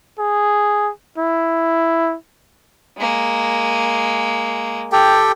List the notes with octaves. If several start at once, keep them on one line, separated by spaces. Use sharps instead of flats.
G#4
E4
G#3 A#3
G4 A4 G5